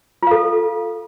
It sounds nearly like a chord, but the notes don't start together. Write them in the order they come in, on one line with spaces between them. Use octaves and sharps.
F4 F5 A4